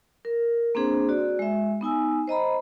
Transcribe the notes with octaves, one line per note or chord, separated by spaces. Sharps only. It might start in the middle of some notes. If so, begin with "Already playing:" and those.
A#4
A#3 C4 D4 G#4 C5
F#4 D5
G#3 E5
B3 D#4 G#5 E6
C5 D#5 A#5 B5